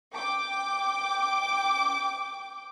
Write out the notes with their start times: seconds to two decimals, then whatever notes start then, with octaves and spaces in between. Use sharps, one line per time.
0.13 G5 D6